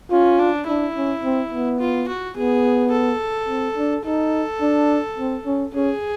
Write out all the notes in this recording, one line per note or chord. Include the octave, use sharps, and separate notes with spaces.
C#4 F4
D4
D4 E4
C#4
C4
B3
F4
F#4
B3 G#4
A4
C4
D4
D#4 A4
D4
C4
C#4
C#4 G#4